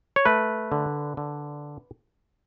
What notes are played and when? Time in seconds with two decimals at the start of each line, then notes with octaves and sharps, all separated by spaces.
0.16 C#5
0.25 A3 B4
0.72 D3
1.17 D3